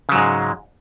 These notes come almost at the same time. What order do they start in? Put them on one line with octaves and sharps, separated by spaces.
C#3 F#3 G#2 G#3